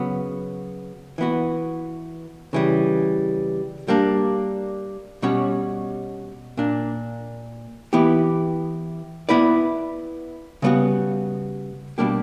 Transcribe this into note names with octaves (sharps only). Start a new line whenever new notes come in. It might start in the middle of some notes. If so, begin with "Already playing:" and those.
Already playing: C#3 F#3 B3
E3 B3 F#4
C#3 E3 G3
G3 A#3 D4
B2 G3 C#4 F#4 C#5
A#2 A#3 D4
E3 B3 E4 G4
B3 E4 B4 D5
C#3 G3 B3 F#4
B2 G3 A#3 D4 G4